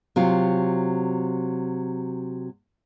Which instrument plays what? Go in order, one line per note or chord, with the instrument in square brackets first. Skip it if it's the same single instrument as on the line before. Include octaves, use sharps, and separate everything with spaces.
[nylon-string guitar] C3 F#3 F4